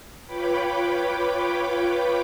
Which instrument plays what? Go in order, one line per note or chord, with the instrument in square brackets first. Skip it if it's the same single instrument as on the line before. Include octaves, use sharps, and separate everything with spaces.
[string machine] F4 B4 C#5 G5 B5 D6